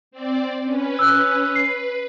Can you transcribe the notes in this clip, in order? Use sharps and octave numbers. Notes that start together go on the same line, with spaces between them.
C4 D5
C#4 B4
E6 F#6
B4 C7